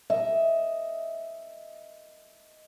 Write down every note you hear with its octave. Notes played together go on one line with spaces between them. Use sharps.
D#5 E5